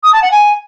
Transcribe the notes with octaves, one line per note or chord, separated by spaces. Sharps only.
D#6
A5
F#5
G#5